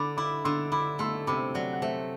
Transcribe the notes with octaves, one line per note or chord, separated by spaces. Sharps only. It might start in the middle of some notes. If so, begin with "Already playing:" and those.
Already playing: D3 B5 D6
E4 B5 D6
D3 C6 E6
E4 B5 D6
A3 C6 E6
C3 B5 D6
F#3 D5 F#5
F#5
A3 C5 E5